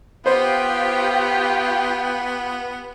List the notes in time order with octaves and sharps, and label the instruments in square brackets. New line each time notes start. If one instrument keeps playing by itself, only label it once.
[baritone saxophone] B3 [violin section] F4 G4 G5 [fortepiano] C5